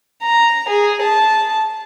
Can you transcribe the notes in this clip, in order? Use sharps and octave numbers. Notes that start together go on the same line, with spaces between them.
A#5
G#4
A5